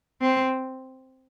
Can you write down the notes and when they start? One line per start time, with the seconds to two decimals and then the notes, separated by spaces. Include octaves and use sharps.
0.21 C4